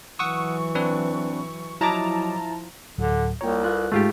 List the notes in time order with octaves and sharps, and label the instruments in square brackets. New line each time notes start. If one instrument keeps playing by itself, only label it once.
[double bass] E3 F#3 [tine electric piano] F#5 D#6 E6 [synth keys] C#6
[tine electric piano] C4 D4 B4
[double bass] F3 [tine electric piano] F#3 D#5 D6 [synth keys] E4 A5 A#5
[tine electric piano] D2 A2 F#3 [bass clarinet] D3
[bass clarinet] C2 [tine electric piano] A#3 F4 A#5 [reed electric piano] C#5 G5
[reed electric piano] F4 [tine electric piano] A4 B4 F#6
[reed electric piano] G#2 G#3 [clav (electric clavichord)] A3 F4 G4